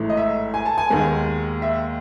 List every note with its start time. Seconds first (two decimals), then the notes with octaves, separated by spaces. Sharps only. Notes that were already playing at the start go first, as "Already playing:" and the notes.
Already playing: A1 G#2 E3 A3
0.09 D#5
0.17 E5
0.54 G#5
0.66 A5
0.78 G#5
0.90 D#2 D#3 G#3 B3
1.62 E5